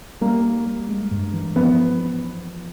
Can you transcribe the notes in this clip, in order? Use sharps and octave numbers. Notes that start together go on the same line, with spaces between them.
G3 A#3
G3
G3
G#3
G2
E3
F3 B3